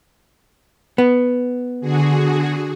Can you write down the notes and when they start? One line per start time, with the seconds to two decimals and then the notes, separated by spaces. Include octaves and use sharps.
0.98 B3
1.81 D3 F#4 G#4